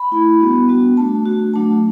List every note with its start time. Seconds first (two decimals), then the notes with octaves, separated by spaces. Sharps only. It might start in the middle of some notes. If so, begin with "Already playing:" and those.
Already playing: B5
0.11 A3 E4
0.40 G3 B3 D4 F#4
0.69 G3 B3 D4 F#4
0.97 A3 D4 F#4 A5
1.25 A3 D4 F#4
1.54 F#3 A3 D4 F#4 A5